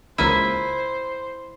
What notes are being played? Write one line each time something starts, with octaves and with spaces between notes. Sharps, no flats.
C#2 A#3 E4 C5 D#7